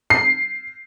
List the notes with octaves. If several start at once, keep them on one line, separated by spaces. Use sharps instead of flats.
C7